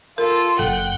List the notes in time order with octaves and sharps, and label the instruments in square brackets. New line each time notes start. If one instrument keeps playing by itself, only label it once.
[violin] F4 A4 [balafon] A#4
[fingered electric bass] F#1 [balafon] A4 [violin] F#5 G5